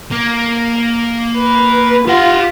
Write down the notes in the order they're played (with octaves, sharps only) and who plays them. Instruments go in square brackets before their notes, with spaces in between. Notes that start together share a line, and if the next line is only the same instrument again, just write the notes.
[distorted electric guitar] A#3
[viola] B4
[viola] F4 [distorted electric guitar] G4 F#5